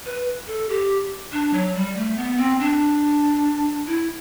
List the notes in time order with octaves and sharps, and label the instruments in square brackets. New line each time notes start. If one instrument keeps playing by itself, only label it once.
[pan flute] B4
A4
G4
D4
F#3
G3
A3
B3
C4
D4
E4